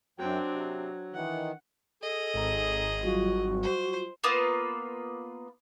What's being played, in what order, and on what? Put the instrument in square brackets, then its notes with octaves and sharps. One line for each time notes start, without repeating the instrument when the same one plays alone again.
[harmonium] F#2 G5 [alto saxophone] F#3 [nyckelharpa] C4 D4
[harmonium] C3
[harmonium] D#3 E3 [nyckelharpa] F#5
[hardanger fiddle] G#4 D#5 [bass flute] A4
[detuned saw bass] G#1 [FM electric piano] G#2 A#5
[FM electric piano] F#3 G3 F4 [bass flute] F#4
[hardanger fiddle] C5
[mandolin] A#3 B3 F4 B4